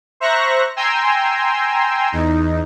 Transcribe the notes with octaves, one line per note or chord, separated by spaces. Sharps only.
C5 E5 A#5 C#6 F#6 A#6
G5 G#5 A#5 C6 E6
E2 D#4